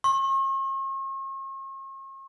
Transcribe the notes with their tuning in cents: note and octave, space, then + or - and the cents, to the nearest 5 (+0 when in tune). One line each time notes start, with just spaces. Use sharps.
C#6 -45